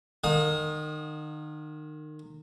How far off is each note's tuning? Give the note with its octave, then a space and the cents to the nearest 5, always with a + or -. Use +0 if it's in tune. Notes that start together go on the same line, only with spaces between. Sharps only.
D#3 -30 F5 +40 D#6 +0